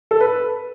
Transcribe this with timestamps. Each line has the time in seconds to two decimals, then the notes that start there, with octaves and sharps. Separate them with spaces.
0.11 A4
0.21 B4